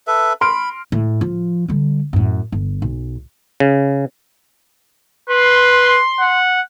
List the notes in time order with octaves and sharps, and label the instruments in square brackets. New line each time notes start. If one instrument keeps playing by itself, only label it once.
[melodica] A4 B4 E5
[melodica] B5 [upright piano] C6 F6 D7
[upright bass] A2
F3
D3 G3
F#2 A2
G1
B1
[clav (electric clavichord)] C#3
[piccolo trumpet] B4 [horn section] C6
[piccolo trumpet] F#5